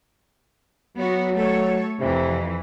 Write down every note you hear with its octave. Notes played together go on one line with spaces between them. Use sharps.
F#3 B3 F#4
A3 A4 C#5
F2 C3 E3